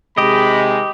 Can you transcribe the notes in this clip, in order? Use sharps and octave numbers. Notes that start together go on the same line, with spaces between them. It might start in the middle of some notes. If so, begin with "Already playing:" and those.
C3 D#3 G#3 G4 D#5 B5